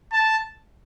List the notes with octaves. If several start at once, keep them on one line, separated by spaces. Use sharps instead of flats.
A5